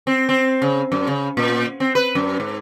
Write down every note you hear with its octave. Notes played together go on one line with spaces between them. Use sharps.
C4
C4
C#3
F#2
C#3
A#2
C4
B4
F#2
G#2